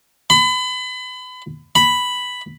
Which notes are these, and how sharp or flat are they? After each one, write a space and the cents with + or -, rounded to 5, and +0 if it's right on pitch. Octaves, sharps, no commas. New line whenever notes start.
B5 +35
B5 +5